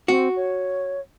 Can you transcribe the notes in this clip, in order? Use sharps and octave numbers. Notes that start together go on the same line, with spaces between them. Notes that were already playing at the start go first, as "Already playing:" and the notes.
C4 F#4
C#5